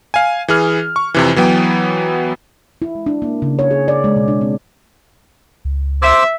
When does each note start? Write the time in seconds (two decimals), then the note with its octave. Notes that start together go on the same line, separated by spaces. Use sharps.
0.14 F5 G#5
0.48 E3 G#4 F6
0.96 C#6
1.14 F2 C3 E3
1.36 E3 F#3 B3 G5
2.82 E4
2.95 G#3
3.06 D4
3.22 A#3
3.42 C#3
3.59 C#5
3.71 G#4
3.88 D5
4.04 G#3
4.16 B2
4.28 D4
4.41 C4
5.65 C#2
6.02 C5 E5 D6 E6